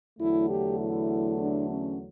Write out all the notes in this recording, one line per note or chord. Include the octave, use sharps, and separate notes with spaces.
E2 D3 F#3 A3 E4
G4
E4
D4
C#4